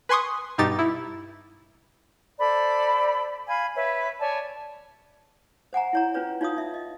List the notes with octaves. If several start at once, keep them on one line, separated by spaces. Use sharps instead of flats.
B4 G#5 C6 C#6 D#6
G2 B2 D#4 G4 A6
E4
A4 C5 D5 B5
F5 G#5 B5
B4 C#5 E5
C#5 D5 G#5 A5
C5 F#5 G#5 A#5
E4 C#5 A#5
C#4 F4 B4 C#5
D#4 F4 C#5 F5 D#6
D#4 E5
D#5